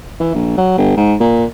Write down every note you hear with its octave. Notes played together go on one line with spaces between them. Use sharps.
E3
A#1
F#3
G1
G#2
A#2